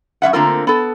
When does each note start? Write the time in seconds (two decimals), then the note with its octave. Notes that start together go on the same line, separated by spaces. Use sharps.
0.22 F#2 C4 E5 F#5
0.33 D3 A3 A#3 C4 F4 A#4
0.67 B3 A4